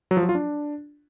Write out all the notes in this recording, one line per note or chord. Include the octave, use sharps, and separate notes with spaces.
F#3
F3
F#3
F4
D4